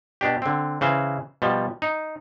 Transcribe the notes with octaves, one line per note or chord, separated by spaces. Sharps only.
B2 D4 G4
D3 C4
C#3 E3 C5
B2 F3 G3
D#4